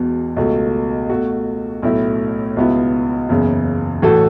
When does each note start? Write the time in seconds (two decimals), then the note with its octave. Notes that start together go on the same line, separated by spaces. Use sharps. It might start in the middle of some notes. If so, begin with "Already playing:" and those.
Already playing: E1 E2 B2
0.36 C#2 B2 A3
1.10 B2 A3 F#4
1.82 B1 A2 A3 E4
2.57 C#2 B2 B3 E4
3.29 F#1 E2 C#3
4.02 A1 A2 A3 F#4 A4